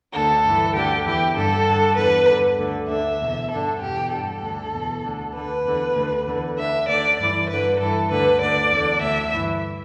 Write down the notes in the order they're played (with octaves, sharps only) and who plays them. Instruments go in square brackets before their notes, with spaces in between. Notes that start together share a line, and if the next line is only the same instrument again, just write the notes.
[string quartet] D2 D3 A4
G2 E3
D2 D3 G4
E2 E3 G4
G2 D3 A4
G2 D3
E2 D3 B4
G2 D3
D2 D3
D2 D3 E5
E2 B2
G2 D3 A4
E2 B2 G4
G2 D3 A4
D2 D3
E2 B2
D2 D3
D2 D3 B4
E2 D3
D2 D3
E2 D3
D2 D3 E5
D2 D3 D5
G2 E3 D5
G2 D3 B4
G2 E3 A4
D2 D3 B4
D2 D3 D5
E2 D3
D2 D3 E5
G2 E3